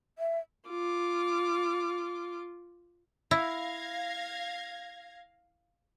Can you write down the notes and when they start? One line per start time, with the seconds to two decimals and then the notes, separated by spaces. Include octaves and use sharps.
0.19 E5
0.69 F4 D6
3.31 E4 F5 G#6 A#6